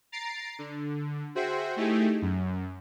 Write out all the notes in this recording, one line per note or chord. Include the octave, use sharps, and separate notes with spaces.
A#5 A6 C7 D7
D3
F#4 G#4 C5 E5 G5
A3 D#4 E4 G4 G#4
F#2